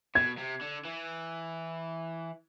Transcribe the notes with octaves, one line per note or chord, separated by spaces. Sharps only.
B2 G#6
C3
D3
E3